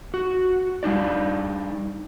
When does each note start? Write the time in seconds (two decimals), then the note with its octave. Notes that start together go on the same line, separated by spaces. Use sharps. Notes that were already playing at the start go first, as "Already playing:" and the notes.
0.14 F#4
0.83 G3 D4 D#4 D5